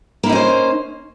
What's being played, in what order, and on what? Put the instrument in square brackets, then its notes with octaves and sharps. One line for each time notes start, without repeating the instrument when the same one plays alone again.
[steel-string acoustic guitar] A#3
E4
D#4
C#4
C5